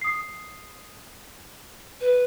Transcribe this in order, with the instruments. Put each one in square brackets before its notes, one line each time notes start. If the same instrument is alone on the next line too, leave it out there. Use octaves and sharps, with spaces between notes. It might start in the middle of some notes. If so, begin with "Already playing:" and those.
[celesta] D#6 C7
[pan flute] B4